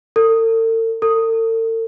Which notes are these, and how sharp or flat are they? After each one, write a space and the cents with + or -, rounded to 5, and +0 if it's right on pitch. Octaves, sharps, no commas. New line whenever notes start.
A4 +45
A4 +45